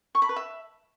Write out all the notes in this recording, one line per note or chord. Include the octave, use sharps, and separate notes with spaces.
C#6
B5
B4
E5